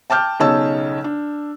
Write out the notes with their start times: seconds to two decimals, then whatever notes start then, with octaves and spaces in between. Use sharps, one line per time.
0.10 G5 A5 D6 F6 G6
0.40 B1 C#3 D#4 C#5 A5 E6
1.04 D4